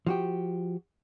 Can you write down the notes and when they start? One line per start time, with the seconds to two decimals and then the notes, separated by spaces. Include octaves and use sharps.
0.07 F3 F#4 G4